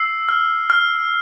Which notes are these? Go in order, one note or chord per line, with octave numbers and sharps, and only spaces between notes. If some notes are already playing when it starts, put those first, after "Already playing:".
Already playing: E6 C7
F6
F6